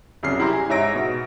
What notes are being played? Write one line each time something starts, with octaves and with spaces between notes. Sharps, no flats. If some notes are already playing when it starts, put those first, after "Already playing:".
C2 F#2 C#3 F6 C7
E4 G4 A#5 C6
G#5
G#2 C#5 E5 A#5 A#6 D7
B2